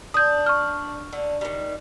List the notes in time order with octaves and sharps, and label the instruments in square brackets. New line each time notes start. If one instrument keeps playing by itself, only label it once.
[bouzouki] D4 [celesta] D#6 G6
[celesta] C#6 F6
[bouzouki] D3
D#3 G3